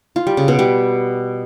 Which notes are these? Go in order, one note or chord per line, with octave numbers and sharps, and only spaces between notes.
F4
G3
C#3
B2
G3